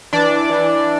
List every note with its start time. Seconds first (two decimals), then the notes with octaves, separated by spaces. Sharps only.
0.13 E3 D4 D5
0.50 E3